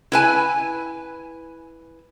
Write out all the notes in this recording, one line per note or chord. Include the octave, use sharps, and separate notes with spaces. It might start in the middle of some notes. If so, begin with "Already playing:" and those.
E4 B4 G#5